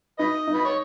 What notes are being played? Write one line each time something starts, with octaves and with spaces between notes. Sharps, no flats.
D#4 B4 D#5
D#4
B4
C#5